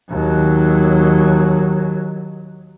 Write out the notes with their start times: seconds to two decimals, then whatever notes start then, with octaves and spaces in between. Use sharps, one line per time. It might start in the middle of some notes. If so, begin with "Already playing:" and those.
0.11 D#2 F#3